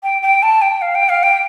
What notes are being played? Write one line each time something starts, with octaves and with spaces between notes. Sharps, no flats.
G5
G5
A5
G5
F5
G5
F5
G5